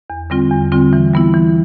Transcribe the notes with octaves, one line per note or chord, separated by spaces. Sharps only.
E2
D3 G3 C4 F4
E2
D3 G3 C4 F4
E3
G3 B3 E4
E3